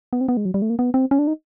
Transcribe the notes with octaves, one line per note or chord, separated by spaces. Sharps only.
B3
C4
B3
G#3
F#3
G3
A3
A#3
B3
C4
C#4
D4
D#4